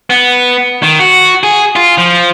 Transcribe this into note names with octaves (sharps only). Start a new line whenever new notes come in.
B3
D#3
F#4
G#4
F4
F3